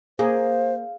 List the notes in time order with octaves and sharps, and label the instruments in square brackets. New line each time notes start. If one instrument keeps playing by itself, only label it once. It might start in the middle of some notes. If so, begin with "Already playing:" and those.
[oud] A#3 [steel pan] G#4 [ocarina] C5 [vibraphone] F5